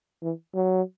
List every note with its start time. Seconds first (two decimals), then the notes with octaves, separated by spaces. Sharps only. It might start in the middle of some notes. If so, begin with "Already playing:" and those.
0.23 E3
0.54 F#3